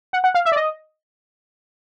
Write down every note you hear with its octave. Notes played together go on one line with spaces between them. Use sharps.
F#5
F#5
F5
E5
D5
D#5